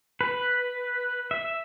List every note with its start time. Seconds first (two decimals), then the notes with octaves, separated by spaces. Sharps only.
0.21 B4
1.31 E5